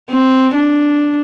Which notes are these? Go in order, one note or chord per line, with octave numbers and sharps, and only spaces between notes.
C4
D4